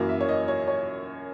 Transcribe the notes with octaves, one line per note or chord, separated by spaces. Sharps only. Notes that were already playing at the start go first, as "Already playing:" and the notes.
Already playing: F#2 E3 A#3
E5
C#5
D#5
C#5
C#5